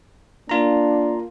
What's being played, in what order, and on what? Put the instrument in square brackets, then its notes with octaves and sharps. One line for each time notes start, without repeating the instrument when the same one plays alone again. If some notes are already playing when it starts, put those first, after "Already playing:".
[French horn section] A#3 [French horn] D4 [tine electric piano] F4 A#5